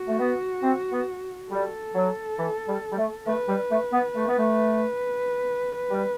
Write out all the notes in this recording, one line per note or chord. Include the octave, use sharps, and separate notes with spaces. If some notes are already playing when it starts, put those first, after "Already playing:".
Already playing: F#4
A3
B3
C4
B3
G3 A4
F#3
E3
G3
G3
A3
A3 B4
G3
A3
B3
A3
B3
A3
G3